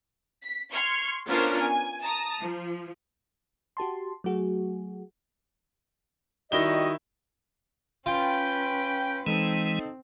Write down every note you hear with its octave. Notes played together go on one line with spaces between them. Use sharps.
B6
C6 C#6 F6 G#6 C#7
B3 C#4 D4 F4 A#4 C5
G#5
A5 A#5 D#6
F3
F#4 G4 A5 C6
F#3 A3 F#4 G#4
D#3 G3 E4 F#4 D#5 G7
C#4 F4 B4 G5
E3 G#3 C4 D#4 A4